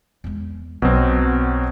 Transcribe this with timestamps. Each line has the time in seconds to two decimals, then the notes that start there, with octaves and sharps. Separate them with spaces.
0.24 E2 G#3
0.82 B1 B2 F#3 C4